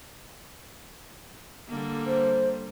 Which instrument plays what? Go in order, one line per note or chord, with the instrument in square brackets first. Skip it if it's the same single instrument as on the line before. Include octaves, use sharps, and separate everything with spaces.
[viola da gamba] D3 G3 A#3
[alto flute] C5